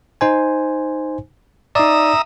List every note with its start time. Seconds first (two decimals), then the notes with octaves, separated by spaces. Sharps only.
0.21 D#4 C5 G#5
1.75 D#4 D5 E5 A#5 D#6